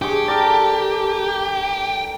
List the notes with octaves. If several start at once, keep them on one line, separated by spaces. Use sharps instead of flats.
G2 G4 G#4 C#6
A4 A#4 D5